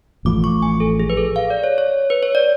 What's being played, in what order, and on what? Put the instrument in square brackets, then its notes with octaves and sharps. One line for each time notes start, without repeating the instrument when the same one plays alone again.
[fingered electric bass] A1 A2 F3 [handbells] D6
[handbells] C#6
G#5
A4
G#4
B4
A4
F5
D5
C#5
C#5
B4
C#5
D5